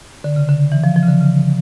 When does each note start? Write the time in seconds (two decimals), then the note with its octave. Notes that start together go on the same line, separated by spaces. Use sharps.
0.24 D3
0.36 C#3
0.49 D3
0.72 E3
0.84 F3
0.96 F3
1.03 C#3
1.08 D3
1.21 C#3